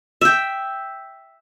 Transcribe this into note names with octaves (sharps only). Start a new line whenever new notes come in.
E5 G5